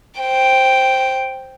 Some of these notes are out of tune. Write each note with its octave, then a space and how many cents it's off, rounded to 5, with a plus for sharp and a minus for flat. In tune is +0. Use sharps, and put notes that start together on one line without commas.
C5 +5 G5 +0